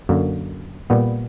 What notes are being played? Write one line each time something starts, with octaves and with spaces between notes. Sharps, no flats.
F#2 D3 A#3
A#2 G3 B3